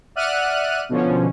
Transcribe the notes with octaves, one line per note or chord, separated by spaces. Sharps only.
D5 E5 F#5 F6 F#6 D#7
B2 D3 F3 C#4